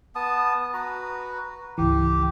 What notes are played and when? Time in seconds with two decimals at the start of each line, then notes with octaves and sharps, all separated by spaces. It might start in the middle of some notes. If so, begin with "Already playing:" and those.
0.15 B3 A5 D#6
0.74 F#4 B4 A#5
1.78 G#1 C#2 E3 G4